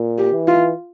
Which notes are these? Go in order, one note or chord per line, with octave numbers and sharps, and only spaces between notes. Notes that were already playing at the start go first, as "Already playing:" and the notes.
Already playing: A#2
G4
E3
F4